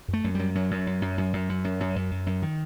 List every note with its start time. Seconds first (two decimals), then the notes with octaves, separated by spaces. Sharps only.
0.08 F#2
0.13 A3
0.24 F#2
0.35 F#2 G3
0.55 F#2 F#3
0.71 F#2
0.87 F#2
1.02 F#2
1.18 F#2
1.33 F#2
1.49 F#2
1.64 F#2
1.80 F#2
1.96 F#2
2.11 F#2
2.26 F#2
2.42 D#3